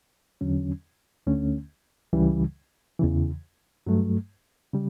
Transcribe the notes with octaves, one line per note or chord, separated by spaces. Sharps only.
E2 D3 F#3 C#4
D2 D3 A3 C#4
C#2 C#3 E3 G3
E2 C#3 E3
G2 F#3 A3
C#3 G3